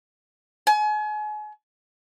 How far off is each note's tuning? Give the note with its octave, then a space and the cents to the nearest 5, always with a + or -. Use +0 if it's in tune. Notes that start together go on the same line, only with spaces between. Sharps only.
G#5 +35